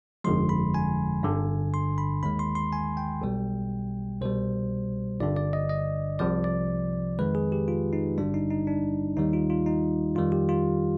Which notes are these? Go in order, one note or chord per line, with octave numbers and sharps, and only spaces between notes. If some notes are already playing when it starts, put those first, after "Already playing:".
G1 F2 D3 F3 G#3 C6
B5
G#5
G1 G2 D3
C6
B5
D#2 D#3 G#3 B5
C6
C6
G#5
G5
B1 B2 G3
C2 B2 G3 C5
G1 G2 D3 D5
D5
D#5
D#5
C2 C3 F3 D5
D5
F2 D#3 G#3 B4
G#4
G4
F4
D#4
G#1 G2 D3 G3 D4
D#4
D#4
D4
D#2 D#3 G3 D#4
F4
F4
D#4
F2 D#3 G3 F4
G4
F4